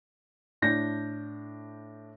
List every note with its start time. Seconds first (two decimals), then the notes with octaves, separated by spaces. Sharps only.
0.62 A2 D4 G6 A#6